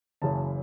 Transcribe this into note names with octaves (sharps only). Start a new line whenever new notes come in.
F#1 F#2 C#3 E3 A5